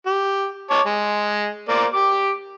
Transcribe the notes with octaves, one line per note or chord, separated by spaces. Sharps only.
G4
C#5 A5 D6
G#3
A#3 C5 D5
G4 D6